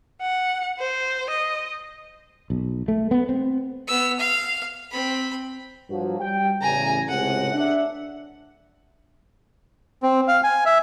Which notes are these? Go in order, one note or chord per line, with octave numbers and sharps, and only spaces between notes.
F#5
C5
D#5
B1
A3
B3
C4
B3 E6
F5
C4 B5
G2 F3 F#3
G3 G5
A1 E2 C#3 G#5 A#5
C#2 A2 C3 F#5
D4 E5
C4
F5
G#5
E5